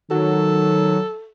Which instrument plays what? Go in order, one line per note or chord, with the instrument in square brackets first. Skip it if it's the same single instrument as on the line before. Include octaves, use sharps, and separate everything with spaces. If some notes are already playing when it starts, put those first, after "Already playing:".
[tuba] D#3 [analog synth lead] F#3 [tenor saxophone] A4